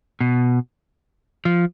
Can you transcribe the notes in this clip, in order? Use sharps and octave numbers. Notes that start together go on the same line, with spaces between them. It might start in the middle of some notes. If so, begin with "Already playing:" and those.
B2
F3